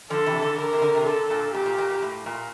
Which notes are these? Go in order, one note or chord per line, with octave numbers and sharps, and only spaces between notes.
D3 F3 A4
C3 E3
D3
D3 A#4
C3
D3
C3
D3 A4
A#2
A#2 G4
A#2
A#2
A#2
A2
A#2